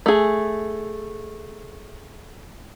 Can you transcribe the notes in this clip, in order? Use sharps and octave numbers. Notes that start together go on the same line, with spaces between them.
A3 G#4